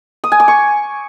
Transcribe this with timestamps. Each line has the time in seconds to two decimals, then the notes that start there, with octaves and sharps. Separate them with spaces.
0.24 D#6
0.32 G#5
0.40 D6
0.48 C#6